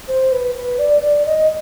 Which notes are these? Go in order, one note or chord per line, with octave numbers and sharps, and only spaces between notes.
C5
B4
B4
D5
D5
D#5